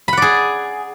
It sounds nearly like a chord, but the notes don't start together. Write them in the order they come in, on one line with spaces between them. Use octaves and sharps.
B5 F#5 D5 G#4